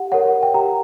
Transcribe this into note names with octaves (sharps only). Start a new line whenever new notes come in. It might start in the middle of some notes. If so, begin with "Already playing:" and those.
Already playing: G4 F#5
A#4 C#5 F#5
G5
G4 A#5